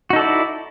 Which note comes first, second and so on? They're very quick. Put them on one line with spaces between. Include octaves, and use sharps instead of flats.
F#4 D#4 A4 D5 E4